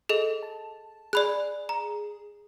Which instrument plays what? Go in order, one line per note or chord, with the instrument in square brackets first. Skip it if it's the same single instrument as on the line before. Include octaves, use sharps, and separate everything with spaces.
[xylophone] G#4 A4 D#5
[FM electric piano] A5
[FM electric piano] G#4 [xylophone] D5 B5 F#6
[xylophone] A#5